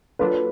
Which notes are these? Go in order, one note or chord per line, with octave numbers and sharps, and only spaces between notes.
F#3 A#3 D4 F4 A4 B4